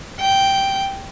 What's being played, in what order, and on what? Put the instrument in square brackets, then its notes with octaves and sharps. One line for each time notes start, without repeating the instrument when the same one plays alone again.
[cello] G5